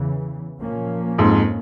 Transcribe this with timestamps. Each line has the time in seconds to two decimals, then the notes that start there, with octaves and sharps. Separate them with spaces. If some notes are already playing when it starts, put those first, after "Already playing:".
Already playing: E2 C#3 E3
0.60 A#2 F3 A#3 C#4
1.18 F2 G#2